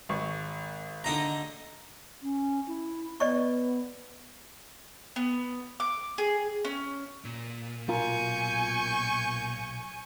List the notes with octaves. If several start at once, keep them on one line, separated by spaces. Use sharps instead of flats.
G#1 C#6
D3 D#4 A#5
C#4
E4
B3 D5 D#5 C#6
B3
D6
G#4
C#4
A#2
B1 F4 A#4 G#5 C#6 G6